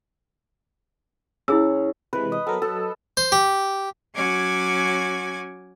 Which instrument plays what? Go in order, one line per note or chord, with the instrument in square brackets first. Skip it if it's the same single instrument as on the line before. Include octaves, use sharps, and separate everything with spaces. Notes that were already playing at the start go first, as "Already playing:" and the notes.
[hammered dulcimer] C#3 [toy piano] E4 G#4 E6
[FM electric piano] C3 E3 G#3 [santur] B4
[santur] D#5
[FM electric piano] F#3 B3 A#4 [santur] A4
[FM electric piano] F#3 [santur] A4
[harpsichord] C5
G4
[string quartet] F#3 C#4 F#4 G#5 D6 G#6